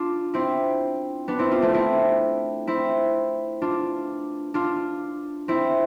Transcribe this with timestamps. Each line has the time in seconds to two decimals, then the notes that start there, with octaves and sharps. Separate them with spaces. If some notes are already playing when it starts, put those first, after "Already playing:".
Already playing: D4 F4
0.34 C4 E4
1.28 B3 D4
1.39 C4 E4
1.51 D4 F4
1.62 A3 C4
1.74 C4 E4
2.67 C4 E4
3.62 D4 F4
4.54 D4 F4
5.48 C4 E4